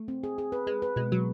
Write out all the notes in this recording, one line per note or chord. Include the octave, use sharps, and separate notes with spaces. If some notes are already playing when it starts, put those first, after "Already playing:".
Already playing: A3
C4
G#4
G#4
B4
G#3 B4
B4
B2 G#3
B2 F#3